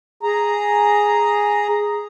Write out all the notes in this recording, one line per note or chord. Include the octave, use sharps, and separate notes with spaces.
G#4 A#5